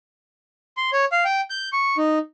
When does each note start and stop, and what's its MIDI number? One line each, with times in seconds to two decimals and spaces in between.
0.77 0.90 84
0.93 1.05 73
1.12 1.24 77
1.25 1.41 79
1.50 1.69 91
1.73 1.97 85
1.98 2.18 63